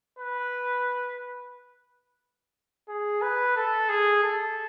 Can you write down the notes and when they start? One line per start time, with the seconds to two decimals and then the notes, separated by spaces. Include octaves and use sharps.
0.19 B4
2.89 G#4
3.22 B4
3.56 A4
3.89 G#4
4.24 A4